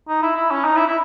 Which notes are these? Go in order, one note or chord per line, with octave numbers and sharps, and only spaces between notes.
D#4
E4
E4
C#4
D#4
E4
E4